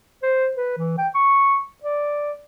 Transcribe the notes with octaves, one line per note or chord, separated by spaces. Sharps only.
C5
B4
E3
G5
C#6
D5